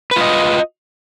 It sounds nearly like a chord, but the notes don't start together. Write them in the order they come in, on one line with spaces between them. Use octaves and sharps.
B4 F4 D#5